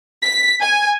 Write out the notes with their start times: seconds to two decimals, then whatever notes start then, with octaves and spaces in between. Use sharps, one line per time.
0.22 B6
0.62 G#5